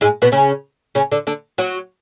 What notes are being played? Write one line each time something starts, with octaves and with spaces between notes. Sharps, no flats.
G#2 G#3
B2 B3
C#3 C#4
C#3 C#4
D3 D4
D3 D4
F#3 F#4